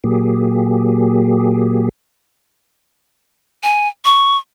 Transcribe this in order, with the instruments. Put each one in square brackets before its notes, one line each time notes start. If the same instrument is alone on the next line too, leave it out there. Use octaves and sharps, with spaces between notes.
[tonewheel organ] A#2 F#3 A#3 G4 G#4
[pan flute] G#5
C#6